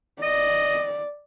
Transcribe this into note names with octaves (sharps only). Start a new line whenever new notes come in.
D5 D#5